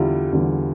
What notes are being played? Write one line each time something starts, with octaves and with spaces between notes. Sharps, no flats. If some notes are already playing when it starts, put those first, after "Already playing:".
Already playing: E2 D3 G3 E4 F4
E2 D3 G3